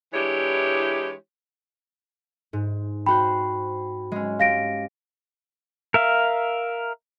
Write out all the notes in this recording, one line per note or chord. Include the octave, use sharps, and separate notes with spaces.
E3 G#3 D4 E4 G4 C#5
G#2
C4 F#4 C5 G5 B5
G#3 C#4
G4 F5 A#6 D7
A#4 E5 F5